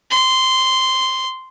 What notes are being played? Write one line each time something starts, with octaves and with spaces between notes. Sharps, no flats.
C6